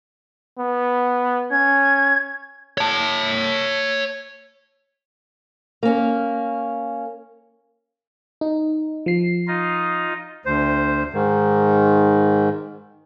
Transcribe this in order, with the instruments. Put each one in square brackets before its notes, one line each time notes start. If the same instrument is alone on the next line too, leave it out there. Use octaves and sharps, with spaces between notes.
[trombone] B3
[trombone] C#4 [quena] G#6
[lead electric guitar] C#5 A5
[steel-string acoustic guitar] A#3 C#4
[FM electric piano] D#4
F3 C7
[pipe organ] D#4 F4 D#5
[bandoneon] D2 C5
G#2 D#3